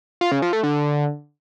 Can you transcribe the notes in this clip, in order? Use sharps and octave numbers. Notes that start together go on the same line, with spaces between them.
F4
C#3
F3
A3
D3